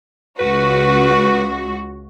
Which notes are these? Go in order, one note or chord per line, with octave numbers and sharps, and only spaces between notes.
C#2 F#4 B4